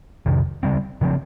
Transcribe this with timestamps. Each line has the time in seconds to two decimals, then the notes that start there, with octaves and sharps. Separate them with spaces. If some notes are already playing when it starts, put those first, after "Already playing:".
0.26 F2 C3 D#3
0.63 C#3 G3 C4
1.01 C#3 F3 C4